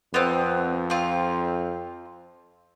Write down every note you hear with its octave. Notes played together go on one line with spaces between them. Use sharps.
F2 B3 C4
C4 F4